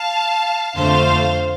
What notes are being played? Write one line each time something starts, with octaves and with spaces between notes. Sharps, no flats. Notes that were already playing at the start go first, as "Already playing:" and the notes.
Already playing: F5 A5
F2 D3 A3 C5 F5